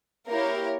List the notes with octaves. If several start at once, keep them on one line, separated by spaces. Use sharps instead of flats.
A#3 E4 G4 A#4 C#5